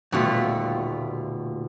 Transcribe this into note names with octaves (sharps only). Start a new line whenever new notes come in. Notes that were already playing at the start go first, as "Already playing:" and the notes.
D#1 D2 B2 A3 F4 B6